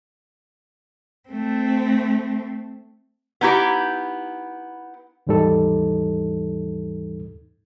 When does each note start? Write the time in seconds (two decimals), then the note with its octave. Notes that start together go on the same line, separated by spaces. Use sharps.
1.29 A3 C4
3.41 B3 D#4 E4 G4
5.27 D#2 G#2 E3 G3 D#4 A4